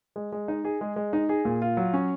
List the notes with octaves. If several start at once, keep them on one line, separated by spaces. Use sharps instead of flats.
G#3
G#3
D#4
G#4
G#3
G#3
D#4
G#4
A#2
F4
F#3
C#4